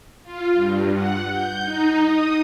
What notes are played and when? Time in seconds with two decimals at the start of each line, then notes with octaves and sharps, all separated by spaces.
0.23 F4
0.53 G2
0.94 F#5
1.30 G6
1.62 D#4
2.06 D#6